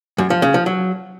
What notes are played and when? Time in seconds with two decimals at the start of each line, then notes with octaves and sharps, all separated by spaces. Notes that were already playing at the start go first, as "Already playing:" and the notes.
0.18 F#2
0.30 F3
0.42 C#3
0.54 F3
0.66 F#3